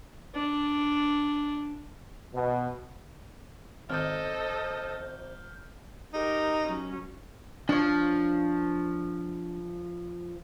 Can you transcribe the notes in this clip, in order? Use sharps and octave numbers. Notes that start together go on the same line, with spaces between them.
D4
B2
G#1 A4 C5 D#5 F6 G6
D#4 G4 A#4
F#3 C#4
F3 D4 C#5